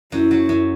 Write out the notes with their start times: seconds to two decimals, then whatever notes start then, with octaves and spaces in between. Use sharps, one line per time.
0.12 F#2 E4
0.31 F#3
0.49 F#2